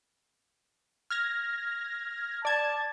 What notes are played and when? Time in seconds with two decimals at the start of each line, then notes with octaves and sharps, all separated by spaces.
1.10 F6 G#6 A#6
2.45 D5 A5 G#6